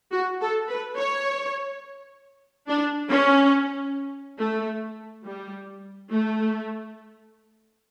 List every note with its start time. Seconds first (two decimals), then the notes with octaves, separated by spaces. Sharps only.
0.12 F#4
0.41 A4
0.69 B4
0.98 C#5
2.68 D4
3.11 C#4
4.39 A3
5.25 G3
6.10 A3